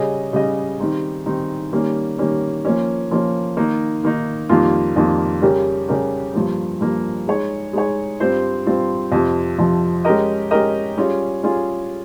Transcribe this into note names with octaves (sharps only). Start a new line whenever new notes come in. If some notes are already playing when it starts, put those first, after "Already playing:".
Already playing: C#3 G3 C#4 G#4 D#5
C#3 G3 C#4 G#4 D#5
D#3 G3 C4 D#4
D#3 G3 C4 D#4
D#3 G3 A#3 C#4
D#3 G3 A#3 C#4
F3 A#3 C#4
F3 A#3 C#4
D#3 A#3 D#4
D#3 A#3 D#4
F2 D#3 G3 A#3 F4
F2 D#3 G3 A#3 F4
C#3 G3 C#4 G4 A#4
C#3 G3 C#4 G4 A#4
G2 F3 A#3
G2 F3 A#3
G#3 D#4 G#4 C#5
G#3 D#4 G#4 C#5
G2 G3 C4 F4 C5
G2 G3 C4 F4 C5
F2 C3 F3
F2 C3 F3
G#3 C#4 G4 A#4 D#5
G#3 C#4 G4 A#4 D#5
G3 C#4 F4 G#4
G3 C#4 F4 G#4